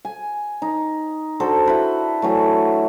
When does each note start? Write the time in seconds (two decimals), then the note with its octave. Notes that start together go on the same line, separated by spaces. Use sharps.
0.05 G#5
0.62 D#4
1.40 D4 F#4 A4 C5
1.66 E4 B4 C5
2.22 E3 F#3 A3